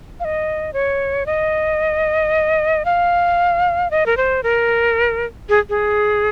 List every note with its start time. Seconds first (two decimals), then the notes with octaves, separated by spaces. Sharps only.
0.20 F5
0.25 D#5
0.73 C#5
1.26 D#5
2.85 F5
3.91 D#5
4.06 A#4
4.17 C5
4.43 A#4
5.49 G#4
5.69 G#4